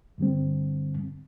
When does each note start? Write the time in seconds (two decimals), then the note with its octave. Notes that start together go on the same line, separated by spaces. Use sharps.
0.18 G2 D3 G3 C4